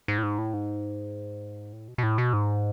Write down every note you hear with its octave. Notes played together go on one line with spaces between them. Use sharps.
G#2
A2
G#2
A2
G#2
A2
B2
B2
A2
B2
G#2